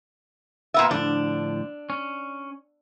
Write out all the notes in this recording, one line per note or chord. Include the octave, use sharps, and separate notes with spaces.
A#2 B3 E5
A2 D3 F3 D4
C#4